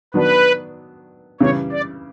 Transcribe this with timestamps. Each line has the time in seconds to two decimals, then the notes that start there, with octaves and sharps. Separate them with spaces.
0.14 D#3 F#3 B3 D4 B4
1.40 C#3 E3 G3 C#5
1.72 D5